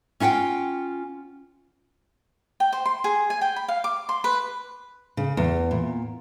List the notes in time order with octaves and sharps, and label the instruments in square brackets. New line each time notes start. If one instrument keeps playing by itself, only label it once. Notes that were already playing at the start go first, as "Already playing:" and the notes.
[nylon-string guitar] C#4 E4 F4 F#5 G5
[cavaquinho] G5
C5
C6
G#4
G#5
G5
B5
F5
D6
C6
B4
[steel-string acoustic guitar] C#3
E2
A#2